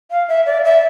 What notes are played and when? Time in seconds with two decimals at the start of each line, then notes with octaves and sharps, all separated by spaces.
0.10 F5
0.28 E5
0.46 D5
0.64 E5